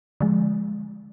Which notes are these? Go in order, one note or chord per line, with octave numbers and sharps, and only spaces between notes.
D3 F3 G#3